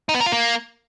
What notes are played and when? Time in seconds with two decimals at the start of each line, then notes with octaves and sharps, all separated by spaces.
0.09 D#4
0.15 B3
0.20 A#4
0.26 F4
0.32 A#3